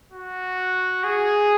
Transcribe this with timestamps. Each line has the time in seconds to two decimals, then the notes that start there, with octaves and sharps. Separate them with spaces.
0.12 F#4
1.04 G#4